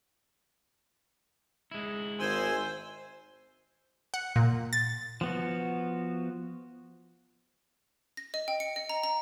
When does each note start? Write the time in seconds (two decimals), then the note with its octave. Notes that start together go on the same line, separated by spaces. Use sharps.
1.71 G#3 E4
2.20 G#1 C5 G#5 C6 E6
4.14 F#5
4.36 A#2
4.73 A6
5.21 F3 B3 F#4
8.17 A#6
8.34 D#5
8.48 G5
8.60 C#7
8.76 D#5
8.89 A#5
9.04 A#5